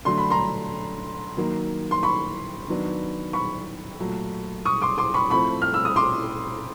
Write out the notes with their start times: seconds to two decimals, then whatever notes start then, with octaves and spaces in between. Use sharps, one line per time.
0.05 D3 F#3 A3 D4 C6
0.18 B5
0.30 A#5 C6
1.37 D#3 F#3 A#3
1.91 C6
2.03 B5 C#6
2.68 D#3 F#3 B3 D4
3.33 B5 C#6
3.99 A#2 F#3 A3
4.65 C#6 D#6
4.82 C6 D6
4.98 C6 D6
5.14 B5 C#6
5.30 A2 F3 A3 C4 B5 C#6
5.62 F6
5.74 E6
5.85 D#6
5.96 C6 D6